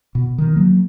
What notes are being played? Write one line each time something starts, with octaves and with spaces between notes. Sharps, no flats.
B2
D#3
F#3 A#3